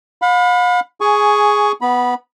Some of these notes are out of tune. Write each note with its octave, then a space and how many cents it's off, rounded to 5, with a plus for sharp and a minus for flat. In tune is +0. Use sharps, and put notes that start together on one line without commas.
F5 +45 B5 +10
G#4 +0 G#5 +10 C#6 +10
B3 +0 B5 -20